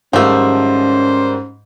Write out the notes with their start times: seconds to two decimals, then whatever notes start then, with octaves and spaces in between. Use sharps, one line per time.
0.13 G#2 D#3 F3 G3 A3 C#4 C5